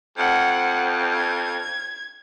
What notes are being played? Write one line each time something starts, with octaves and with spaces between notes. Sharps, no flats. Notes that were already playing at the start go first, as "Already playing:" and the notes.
F2 F#5
G#6